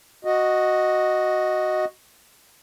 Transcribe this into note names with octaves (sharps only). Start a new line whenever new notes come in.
F#4 D#5